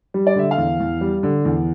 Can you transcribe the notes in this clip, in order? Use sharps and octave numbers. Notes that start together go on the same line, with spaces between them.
G3
D5
D3 E5
F5
E2
E2
G3
D3
E2